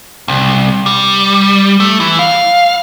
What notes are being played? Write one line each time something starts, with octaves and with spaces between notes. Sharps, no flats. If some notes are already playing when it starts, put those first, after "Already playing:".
C2
G3
A3
E3
F5